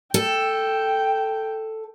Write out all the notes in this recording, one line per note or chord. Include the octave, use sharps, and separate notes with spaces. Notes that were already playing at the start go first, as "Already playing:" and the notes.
A4 G5